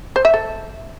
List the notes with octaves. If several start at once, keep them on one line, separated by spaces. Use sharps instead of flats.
C5
E5
A4